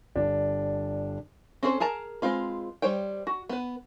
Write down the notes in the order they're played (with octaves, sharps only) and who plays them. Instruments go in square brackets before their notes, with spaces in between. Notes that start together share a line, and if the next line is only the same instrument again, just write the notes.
[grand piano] G1 D4
[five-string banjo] C4 C#4 G#4 A4 C5
G#4 A#4 A5 A#5
G#3 C4 F4 B4
G3 C5 C#5 G5
F#4
B3 B4